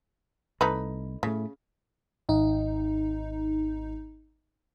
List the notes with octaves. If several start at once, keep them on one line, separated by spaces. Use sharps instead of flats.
C2 A3 D#4 B4
A2 C#3 A3
G#1 D#4